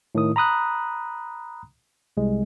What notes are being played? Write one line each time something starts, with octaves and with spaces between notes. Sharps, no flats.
A2 D#3 D#6
A#5 B5 D#6 F#6
C2 G#3